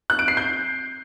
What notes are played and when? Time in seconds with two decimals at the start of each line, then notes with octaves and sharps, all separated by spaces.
0.10 F#6
0.19 D7
0.28 C7
0.37 G6